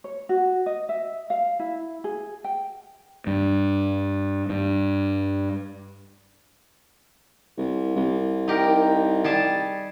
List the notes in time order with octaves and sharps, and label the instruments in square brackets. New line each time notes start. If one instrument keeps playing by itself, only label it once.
[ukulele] C#5
F#4
D#5
E5
F5
E4
G#4
G5
[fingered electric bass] G2
G2
[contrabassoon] C2
C2
[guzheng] D#4 G4 A#4
G3 G#4 A5